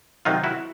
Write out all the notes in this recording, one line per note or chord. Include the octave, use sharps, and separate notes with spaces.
C3 D#3 F#3 D#4 F4
E4 F#4